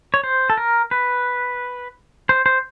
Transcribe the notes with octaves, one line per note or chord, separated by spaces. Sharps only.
C#5
C5
A4
A#4
B4
C5
C5